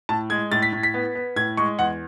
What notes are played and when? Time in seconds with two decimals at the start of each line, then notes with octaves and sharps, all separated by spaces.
0.09 A2 A5
0.30 G#3 G#6
0.52 A2 A6
0.62 B6
0.73 A2
0.83 B6
0.94 B3
1.15 B3
1.36 A2 G#6
1.57 G#3 C#6
1.79 E2 F#5